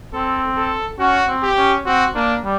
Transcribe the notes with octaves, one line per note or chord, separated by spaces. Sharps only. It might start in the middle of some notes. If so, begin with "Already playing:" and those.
C4 A4
A4
C#4 F#4
C4
G4
C#4
C4 F#4
A#3 D4
G3